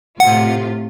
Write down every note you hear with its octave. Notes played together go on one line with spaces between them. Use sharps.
A2 C3 F4 F#5